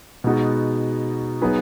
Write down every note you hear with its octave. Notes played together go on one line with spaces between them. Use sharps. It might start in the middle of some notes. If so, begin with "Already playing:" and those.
B2 G#3 B3 D#4 F#4
F#3 B3 D#4 G#4 B4